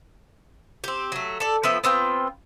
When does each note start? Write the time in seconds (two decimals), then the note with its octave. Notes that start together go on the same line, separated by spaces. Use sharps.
0.84 C4 G4
1.12 F#3 A3
1.40 A4 D5
1.63 F3 B3 E5 G5
1.84 B3 C4 F4 G5